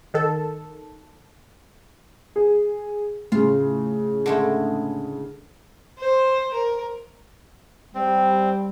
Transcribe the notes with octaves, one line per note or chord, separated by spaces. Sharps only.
D#3 A4
G#4
A2 C#3 F4
D3 G#3 A3
C5
A#4
G3 C4